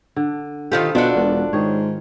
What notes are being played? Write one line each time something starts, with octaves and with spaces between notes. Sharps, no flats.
D3
D#3 F4 G4 A4 B4 C5
B2 D4 F4 F#4 E5
E1
G#2 D#3 C#5